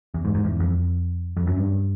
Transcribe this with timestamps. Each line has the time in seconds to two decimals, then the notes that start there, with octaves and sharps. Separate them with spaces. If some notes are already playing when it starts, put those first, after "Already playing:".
0.14 E2
0.25 G#2
0.35 G#2
0.45 E2
0.60 F2
1.37 F2
1.47 F#2
1.57 G2